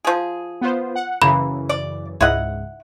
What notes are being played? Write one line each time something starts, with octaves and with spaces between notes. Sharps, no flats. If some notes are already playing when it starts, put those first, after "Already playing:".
F3 G#4
B3 F4 C5
F#5
F#2 C#3 E3 A#3 B5
D5
C#2 G#2 E4 D#5 F#5